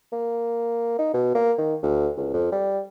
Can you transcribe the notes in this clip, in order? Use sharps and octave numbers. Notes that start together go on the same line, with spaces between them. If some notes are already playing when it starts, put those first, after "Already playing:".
A#3
D#4
B2
A#3
D#3
D2
C#2
F2
G3